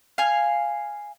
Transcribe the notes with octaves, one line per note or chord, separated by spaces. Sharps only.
F5 G#5